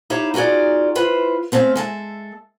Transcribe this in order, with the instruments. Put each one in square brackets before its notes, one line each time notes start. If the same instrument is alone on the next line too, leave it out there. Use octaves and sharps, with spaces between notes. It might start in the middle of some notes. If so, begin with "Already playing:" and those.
[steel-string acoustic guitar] D#4 E4 G4 C#5 F5
D#4 F4 F#4 G#4 D5
E4 F4 B4 C5
A3 C4 C#4 F5
G#3 A4 E5